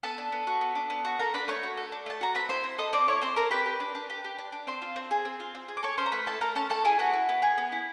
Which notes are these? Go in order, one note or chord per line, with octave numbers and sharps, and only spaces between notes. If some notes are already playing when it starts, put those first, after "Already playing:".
B3 A4 A5
D4
B3
F#4
B3
D4
B3
F#4
A4 A#4 A#5
D4 B4 B5
A3 C#5 C#6
F#4
A4
D4
A3 A5
F#4 A#5
C4 B4 B5
E4 C5 C6
C4
A4 D#5 D#6
C4 D5 D6
E4 C#5 C#6
C4 C5 C6
A4 A#4 A#5
G4 B4 B5
G4
D4
D4
G4
G4
D4
D4
C4 C5 C6
F4
C4
G#4
C4
F4
C4
G#4
D6
A4 C#5 C#6
C#4 C5 C6
A#5
A3 B4 B5
E4 A4 A5
A4 A#4 A#5
C#4 A4 A5
A3 A4 A5
E4 G#4 G#5
B3 F#4 F#5
E4
B3
G#4
B3
E4